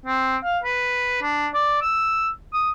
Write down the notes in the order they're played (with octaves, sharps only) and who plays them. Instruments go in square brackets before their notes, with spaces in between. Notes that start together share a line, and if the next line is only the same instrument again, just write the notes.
[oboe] C4
F5
B4
D4
D5
E6
D#6